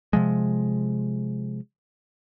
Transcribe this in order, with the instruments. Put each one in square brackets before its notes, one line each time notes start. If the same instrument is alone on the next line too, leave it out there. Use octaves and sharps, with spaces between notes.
[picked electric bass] C3 F3 G#3